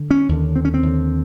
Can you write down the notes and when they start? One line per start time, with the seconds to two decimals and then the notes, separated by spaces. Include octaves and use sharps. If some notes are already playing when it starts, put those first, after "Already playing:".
Already playing: D3
0.11 C#4
0.29 D#2 D3
0.56 C4
0.65 C#4
0.74 C4
0.83 D#2 D3